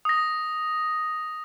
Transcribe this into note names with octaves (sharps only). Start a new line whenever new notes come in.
D#6 A#6